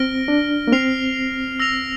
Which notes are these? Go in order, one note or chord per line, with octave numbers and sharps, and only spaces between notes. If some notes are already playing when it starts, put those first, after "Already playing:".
Already playing: C4 F6 A#6 D7 G7
D4
A#3
C4 F6 C7 F7
E6 A#6 F7